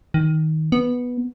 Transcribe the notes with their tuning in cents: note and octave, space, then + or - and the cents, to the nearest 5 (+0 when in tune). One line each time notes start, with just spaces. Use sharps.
D#3 +15
B3 -5